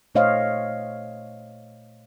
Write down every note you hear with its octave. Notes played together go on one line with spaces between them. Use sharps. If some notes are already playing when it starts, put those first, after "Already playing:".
A#2 A3 C5 C#5 D#5 F5